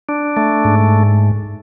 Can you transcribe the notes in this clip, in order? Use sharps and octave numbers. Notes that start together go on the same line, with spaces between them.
D4
A3
G#2